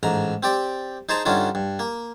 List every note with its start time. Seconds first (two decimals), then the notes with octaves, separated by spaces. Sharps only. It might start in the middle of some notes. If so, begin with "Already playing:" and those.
0.03 A1 G#2 A#5
0.43 C4 G4 D5
1.09 D#4 G#4 C5 A5 A#5
1.26 G2 D3 C#4 D#4 F4
1.55 G2
1.79 A#3